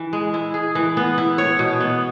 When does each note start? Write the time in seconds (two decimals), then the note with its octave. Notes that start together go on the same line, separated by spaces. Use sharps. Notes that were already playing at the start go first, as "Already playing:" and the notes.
Already playing: E3
0.13 G#3
0.34 E4
0.54 G#4
0.75 E3
0.97 B3
1.18 E4
1.38 C#5
1.59 B2
1.80 B3